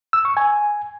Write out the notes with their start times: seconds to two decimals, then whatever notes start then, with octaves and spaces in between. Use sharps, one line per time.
0.13 E6
0.25 C#6
0.37 G#5